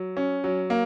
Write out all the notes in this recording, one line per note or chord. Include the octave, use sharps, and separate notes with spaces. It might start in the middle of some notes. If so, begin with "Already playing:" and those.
Already playing: F#3
C#4
F#3
A#3